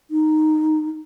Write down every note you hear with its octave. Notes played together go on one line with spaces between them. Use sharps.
D#4